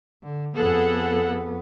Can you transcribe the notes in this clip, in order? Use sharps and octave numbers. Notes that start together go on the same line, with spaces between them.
D3
F2 B3 G#4 A4 F#5